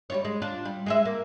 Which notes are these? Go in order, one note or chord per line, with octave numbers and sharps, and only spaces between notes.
G3 F4 C#5
G#3
D4 F4
G3
G#3 G#4 E5
A#3